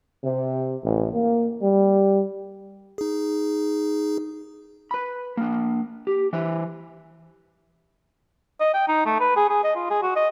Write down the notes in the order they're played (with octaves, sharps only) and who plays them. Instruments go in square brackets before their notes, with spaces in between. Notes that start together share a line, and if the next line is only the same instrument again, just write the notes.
[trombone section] C3
A1
A#3
G3
[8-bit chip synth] D#4 G#4
[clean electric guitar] B4 B5
A#3 D4
G4
E3 B4 C5 E5
[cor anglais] D#5
G5
D#4
A3
B4
G#4
G#4
D#5
F4
G#4
F#4
D#5